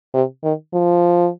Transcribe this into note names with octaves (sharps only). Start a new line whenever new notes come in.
C3
D#3
F3